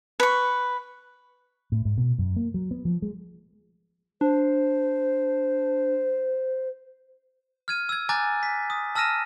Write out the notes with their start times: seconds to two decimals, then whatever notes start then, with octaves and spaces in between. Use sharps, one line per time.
0.20 B4 C#6
1.72 A2
1.85 G#2
1.98 B2
2.19 F#2
2.36 A#3
2.54 F#3
2.71 B3
2.85 F3
3.02 G#3
4.21 D4 C5
7.68 F6 G#6 D#7
7.89 E6 G#6
8.09 G#5 A#5 D6 F#6 A6
8.43 B6
8.70 D#6
8.95 A5 E6 F6 A#6 D#7 E7